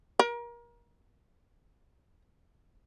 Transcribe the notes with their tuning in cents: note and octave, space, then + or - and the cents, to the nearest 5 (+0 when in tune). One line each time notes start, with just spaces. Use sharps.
A#4 +30